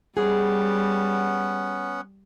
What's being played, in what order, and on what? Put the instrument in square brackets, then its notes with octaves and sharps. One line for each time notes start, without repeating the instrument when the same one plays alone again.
[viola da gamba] G3 [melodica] B3 C#4 F#5 [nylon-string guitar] G#4